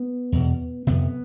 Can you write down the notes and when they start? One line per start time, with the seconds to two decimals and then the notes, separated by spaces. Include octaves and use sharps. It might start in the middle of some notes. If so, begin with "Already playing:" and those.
Already playing: B3
0.32 E2 B2
0.87 F2 C3 B3